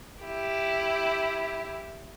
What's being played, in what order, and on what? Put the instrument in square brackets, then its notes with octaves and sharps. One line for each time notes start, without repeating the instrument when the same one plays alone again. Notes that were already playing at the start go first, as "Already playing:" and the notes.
[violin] E4 G4